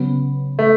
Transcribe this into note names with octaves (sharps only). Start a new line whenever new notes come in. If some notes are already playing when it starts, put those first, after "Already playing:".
Already playing: C#3 F#3 B3
A3